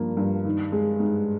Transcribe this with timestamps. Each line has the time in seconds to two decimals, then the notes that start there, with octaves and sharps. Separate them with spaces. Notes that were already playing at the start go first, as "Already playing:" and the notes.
Already playing: G2 F3 A#3
0.17 G2
0.45 D#3
0.72 G#3
1.00 G#2